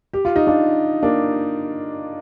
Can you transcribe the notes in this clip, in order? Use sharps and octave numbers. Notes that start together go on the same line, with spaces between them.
G4
F4
D#4
D4 F4
A#3 D4